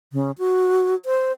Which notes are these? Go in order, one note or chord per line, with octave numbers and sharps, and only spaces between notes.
C#3
F#4
C5